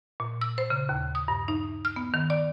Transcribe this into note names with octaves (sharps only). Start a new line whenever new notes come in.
A#2
E6
C5
C#3
D#2
D#6
G2
D#4
F6
B3
D#3
D5